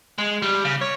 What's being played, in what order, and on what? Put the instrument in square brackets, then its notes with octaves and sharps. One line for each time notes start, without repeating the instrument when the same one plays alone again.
[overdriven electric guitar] G#3
G3
C#3
C#5